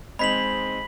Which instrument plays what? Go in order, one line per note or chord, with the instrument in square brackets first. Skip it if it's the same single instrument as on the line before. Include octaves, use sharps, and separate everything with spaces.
[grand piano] G#3 C4 D#4 [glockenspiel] B5 B6 F#7